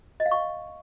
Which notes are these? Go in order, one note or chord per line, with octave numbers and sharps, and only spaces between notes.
D#5
F5
C#6